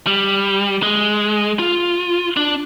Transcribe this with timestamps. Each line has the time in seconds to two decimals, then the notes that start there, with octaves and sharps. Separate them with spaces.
0.07 G3
0.83 G#3
1.59 F4
2.37 D4